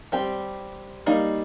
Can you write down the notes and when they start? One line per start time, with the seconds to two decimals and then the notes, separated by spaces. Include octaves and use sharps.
0.12 G3 C4 G4
1.06 G3 A#3 D#4